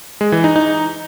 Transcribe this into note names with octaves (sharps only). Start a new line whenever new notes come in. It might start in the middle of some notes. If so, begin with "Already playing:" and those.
G#3
E3
D#4
D#4